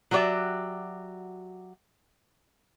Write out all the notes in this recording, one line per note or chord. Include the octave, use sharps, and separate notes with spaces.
F#3 F#4 G4 C#5 D5 E5